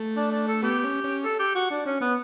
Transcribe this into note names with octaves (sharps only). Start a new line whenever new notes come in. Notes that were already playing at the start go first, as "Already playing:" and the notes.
Already playing: A3
D4
D4
A4
B3 G4
C#4
C#4
A4
G4
F#4
D4
C#4
B3